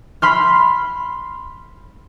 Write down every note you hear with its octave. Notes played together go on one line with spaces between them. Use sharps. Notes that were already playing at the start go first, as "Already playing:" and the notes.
B5 C6 F6